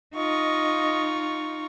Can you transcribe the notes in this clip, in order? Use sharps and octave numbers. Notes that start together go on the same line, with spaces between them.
D#4 F4 D#5 C#6